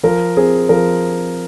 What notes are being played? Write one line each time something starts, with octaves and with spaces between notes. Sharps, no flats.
F3 A#4
C4 G#4
F3 A#4